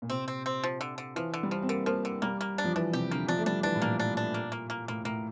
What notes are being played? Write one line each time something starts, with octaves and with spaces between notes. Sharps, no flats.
A#2
C3 C4
C4
C4
F3
D3
D3
E3 F3
D3
G3
F3
C4
D3 A#3
F3 A#3
D3
G3 A#3
A#3
D4
F3
E3 D4
C3 G4
D3 A#3
F3 D4
A3
G3 D4
E3 D4
A2
A#2 A#3
D4
D4
A#3
A#3
A#3
A2 A#3
A2 A#3